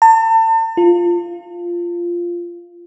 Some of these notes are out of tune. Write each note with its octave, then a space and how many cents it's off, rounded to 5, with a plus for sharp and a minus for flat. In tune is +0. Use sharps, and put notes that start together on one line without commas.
A5 +40
F4 -10